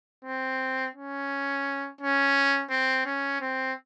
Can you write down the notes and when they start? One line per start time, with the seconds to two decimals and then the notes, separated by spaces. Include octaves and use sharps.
0.25 C4
0.95 C#4
2.01 C#4
2.70 C4
3.06 C#4
3.41 C4